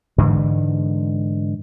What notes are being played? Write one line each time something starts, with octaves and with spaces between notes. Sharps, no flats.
G#2 D3 E3 G#3